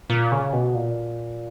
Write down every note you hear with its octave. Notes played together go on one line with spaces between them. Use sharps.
A#2
C#3
B2
A#2